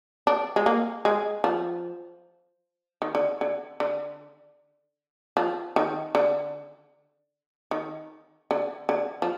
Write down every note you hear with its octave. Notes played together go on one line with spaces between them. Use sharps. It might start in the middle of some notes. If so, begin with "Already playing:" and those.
D4
G#3
A#3
G#3
F3
D#3
D3
D3
D3
F3
D#3
D3
D#3
D3
D3
F3